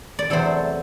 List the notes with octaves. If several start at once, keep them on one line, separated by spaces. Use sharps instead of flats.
D5
E2 C3 F#3 A3 A4 C5